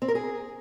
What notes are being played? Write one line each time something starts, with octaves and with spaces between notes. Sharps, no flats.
C4
A#4
G#4